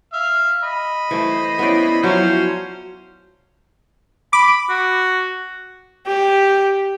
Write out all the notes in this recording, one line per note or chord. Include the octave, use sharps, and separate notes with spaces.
E5 F5
D#5 B5
E3 A3 C5
B3 C#4 E4 C5 D5
F3 F#3 C#4 E4 F4 C5
B5 D6
F#4
G4